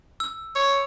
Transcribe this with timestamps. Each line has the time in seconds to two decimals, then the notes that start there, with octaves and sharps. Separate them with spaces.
0.20 E6
0.55 C#5